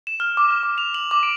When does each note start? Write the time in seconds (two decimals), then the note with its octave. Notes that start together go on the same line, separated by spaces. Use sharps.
0.07 E7
0.20 F6
0.37 D6
0.51 F6
0.63 D6
0.78 F7
0.94 F#7
1.11 D6
1.23 D7